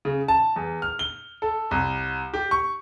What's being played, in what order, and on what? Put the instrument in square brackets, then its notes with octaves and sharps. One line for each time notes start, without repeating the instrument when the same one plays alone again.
[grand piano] C#3
A5
E2
F6
G7
A4
C2
G4
C#6